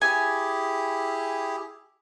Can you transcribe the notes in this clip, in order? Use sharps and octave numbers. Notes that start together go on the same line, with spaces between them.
E4 G4 G#4 G#5